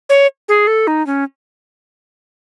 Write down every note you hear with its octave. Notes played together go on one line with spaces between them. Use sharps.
C#5
G#4
A4
D#4
C#4